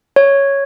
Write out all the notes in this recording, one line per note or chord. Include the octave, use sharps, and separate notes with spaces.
C#5